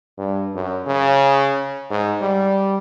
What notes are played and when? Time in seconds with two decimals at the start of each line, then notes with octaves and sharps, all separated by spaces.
0.18 G2
0.55 F#2
0.87 C#3
1.90 G#2
2.21 G3